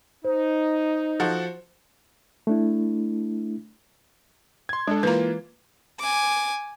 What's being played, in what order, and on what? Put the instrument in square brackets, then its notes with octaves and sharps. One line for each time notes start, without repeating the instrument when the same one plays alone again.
[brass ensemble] D#4 [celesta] C5
[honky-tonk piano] F3 F#4 A4
[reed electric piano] A3 D4 E4
[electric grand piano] C6 G#6
[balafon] G#3 [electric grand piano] D4 A4
[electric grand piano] E3 A#3 F4 [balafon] B4 A#5
[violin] G#5 D6